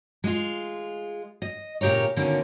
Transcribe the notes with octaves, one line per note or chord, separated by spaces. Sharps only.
G#3 F4
D#5
A#2 C#3 G4 A#4 C#5
B2 D3 D#3 A#3 C#4